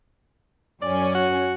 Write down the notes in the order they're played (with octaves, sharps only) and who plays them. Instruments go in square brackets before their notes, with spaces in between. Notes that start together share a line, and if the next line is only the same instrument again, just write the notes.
[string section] F#2 C#4 [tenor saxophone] D5
[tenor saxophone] F#4